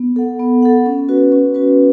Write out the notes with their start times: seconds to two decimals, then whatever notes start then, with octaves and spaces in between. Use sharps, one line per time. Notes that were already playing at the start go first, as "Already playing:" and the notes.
Already playing: B3
0.16 A4 F#5
0.39 B3
0.63 A4 F#5
0.86 C#4
1.09 F#4 B4
1.32 C#4
1.54 F#4 B4